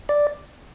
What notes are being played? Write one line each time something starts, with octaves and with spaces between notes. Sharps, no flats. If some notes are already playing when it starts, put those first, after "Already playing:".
D5